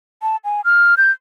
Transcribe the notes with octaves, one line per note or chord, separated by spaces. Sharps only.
A5
G#5
F6
G6